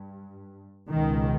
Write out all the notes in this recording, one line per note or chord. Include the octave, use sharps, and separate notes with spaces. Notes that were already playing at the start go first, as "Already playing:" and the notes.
Already playing: G2
C#2 B2 D#3